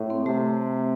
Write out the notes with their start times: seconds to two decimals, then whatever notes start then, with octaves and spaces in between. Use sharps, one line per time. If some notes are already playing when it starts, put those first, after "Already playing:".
Already playing: A2
0.10 C4
0.25 C3 A3